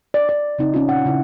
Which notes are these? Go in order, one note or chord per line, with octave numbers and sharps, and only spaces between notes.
D5
D5
C#3 C4 D#4
C#4 F4
A#2 F#5
C#3 E4